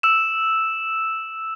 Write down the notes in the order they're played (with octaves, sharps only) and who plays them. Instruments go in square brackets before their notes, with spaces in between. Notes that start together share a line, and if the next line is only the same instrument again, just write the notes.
[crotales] E6 E7